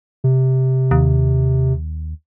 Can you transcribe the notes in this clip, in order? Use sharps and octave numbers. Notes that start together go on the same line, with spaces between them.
C3
D#2